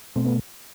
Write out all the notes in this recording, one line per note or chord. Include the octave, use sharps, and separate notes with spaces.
B2 A3 C4
B3